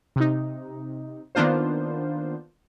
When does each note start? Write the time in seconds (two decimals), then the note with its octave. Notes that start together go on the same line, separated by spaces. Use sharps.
0.16 C3 D#4
1.35 D#3 A#3 B3 D4 F4 C5